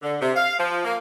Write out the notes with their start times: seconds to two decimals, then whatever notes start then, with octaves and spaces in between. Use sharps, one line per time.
0.02 D3
0.20 C3
0.35 F5
0.58 F3
0.84 A#3